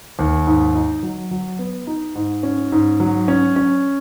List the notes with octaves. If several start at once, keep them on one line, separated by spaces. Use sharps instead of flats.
D#2
G#2
D#4
F#3
F#3
B3
D#4
G#2
C#4
G#2
F#3
C#4
C#4